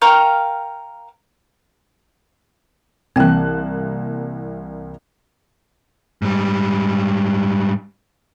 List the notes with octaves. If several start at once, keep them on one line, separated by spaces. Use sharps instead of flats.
A#4 F5 G5 C#6
C2 E3 A#3 C4 G5 A5 F#6
G#2 G3